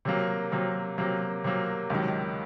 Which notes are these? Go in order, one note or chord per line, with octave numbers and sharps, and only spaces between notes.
C3 F#3 A#3
C3 F#3 A#3
C3 F#3 A#3
C3 F#3 A#3
C#2 C3 D#3 F#3